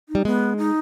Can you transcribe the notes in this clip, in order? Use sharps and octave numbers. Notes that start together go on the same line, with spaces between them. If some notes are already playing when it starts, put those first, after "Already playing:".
D#4
G3
G#3 B3
D#4